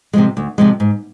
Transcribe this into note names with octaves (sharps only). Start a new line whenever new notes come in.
C3 F3 G#3
D2
C3 F3 G#3
G#2